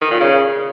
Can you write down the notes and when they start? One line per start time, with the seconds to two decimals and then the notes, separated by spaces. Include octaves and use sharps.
0.02 D#3
0.11 A#2
0.20 C#3